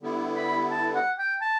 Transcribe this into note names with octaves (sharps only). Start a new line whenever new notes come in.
D3 G3 B3 E4
B5
A5
F#5
G5
A5